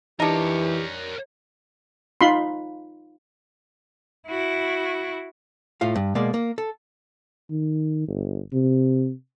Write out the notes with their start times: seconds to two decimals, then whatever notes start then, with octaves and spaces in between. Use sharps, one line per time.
0.20 E3 D4 D#4 G4 A#4 C#5
2.21 D#4 F4 B5 C6
4.27 E4 F#4
5.81 A2 F4 F5
5.96 G2
6.15 B2 G#3 A#3 D5
6.34 A#3
6.58 A4
7.50 D#3
8.08 G1
8.53 C3